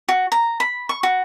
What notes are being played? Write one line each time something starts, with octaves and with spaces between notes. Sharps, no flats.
F#4
A#5
B5
C#6
F#4